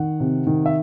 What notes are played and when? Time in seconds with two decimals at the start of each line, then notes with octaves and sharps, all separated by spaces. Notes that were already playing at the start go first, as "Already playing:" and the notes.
Already playing: D#3 F#5
0.20 C3
0.47 D#3
0.66 E5